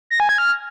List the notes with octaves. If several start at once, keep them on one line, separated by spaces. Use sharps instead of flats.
A#6
G#5
G#6
F6